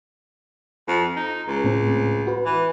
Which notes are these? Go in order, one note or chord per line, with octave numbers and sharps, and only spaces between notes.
F2
D#4
C#2
A2 C4
F#4 B4
E3